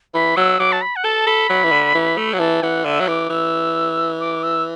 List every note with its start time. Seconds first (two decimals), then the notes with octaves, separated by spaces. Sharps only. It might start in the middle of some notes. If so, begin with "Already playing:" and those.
0.14 E3 B5
0.37 F#3 E6
0.59 F#3 D6
0.72 A5
0.82 B5
0.96 F#5
1.04 A4 A5
1.27 A4 B5
1.49 F#3
1.64 E3
1.71 D3
1.94 E3
2.17 A3
2.33 F#3
2.39 E3 A5
2.63 E3 F#5
2.85 D3 E5
3.00 F#3
3.07 E3 D6
3.30 E3 E6
4.20 D6
4.43 E6